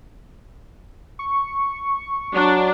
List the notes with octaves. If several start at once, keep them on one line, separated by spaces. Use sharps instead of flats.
C#6
F#3 D4